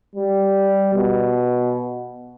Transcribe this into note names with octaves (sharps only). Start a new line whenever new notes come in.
G3
B2